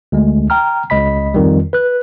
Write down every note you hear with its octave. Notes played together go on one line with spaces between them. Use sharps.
D2 G#3
G5 A#5 F6
C#2 D#5 B5 B6
F2 D#3 G3
B4 F#6